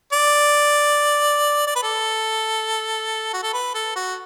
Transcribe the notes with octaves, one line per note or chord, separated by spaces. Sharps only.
D5
D5
B4
A4
F#4
A4
B4
A4
F#4